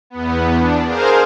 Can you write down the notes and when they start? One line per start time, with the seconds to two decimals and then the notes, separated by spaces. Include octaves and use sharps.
0.10 E2 B3
0.57 D4
0.86 G#4 A#4 C5 F5